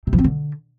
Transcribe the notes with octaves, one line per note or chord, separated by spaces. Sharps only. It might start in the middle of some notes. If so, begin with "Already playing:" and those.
C3
F3
C4
D3